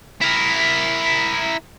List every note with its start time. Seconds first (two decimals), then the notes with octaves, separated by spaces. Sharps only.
0.21 E4 A#4